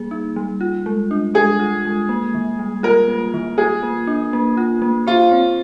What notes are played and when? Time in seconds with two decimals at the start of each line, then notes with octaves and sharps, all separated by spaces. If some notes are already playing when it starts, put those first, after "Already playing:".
Already playing: G3 A#3 G#4
0.11 D#4
0.36 G3
0.61 F4
0.86 G#3
1.11 D4
1.34 G#3 G#4
1.59 F4
1.85 G#3
2.09 A#3
2.34 D#3
2.59 G3
2.83 F4 A#4
3.08 A#3
3.34 D#3
3.58 F4 G#4
3.83 A#3
4.07 D4
4.33 A#3
4.57 F4
4.82 A#3
5.07 F4 C5
5.32 C4